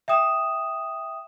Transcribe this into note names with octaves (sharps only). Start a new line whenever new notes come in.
E5 G5 D#6 E7